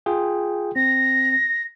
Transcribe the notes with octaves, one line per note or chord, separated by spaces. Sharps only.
F4 G#4 G5
C4 A#6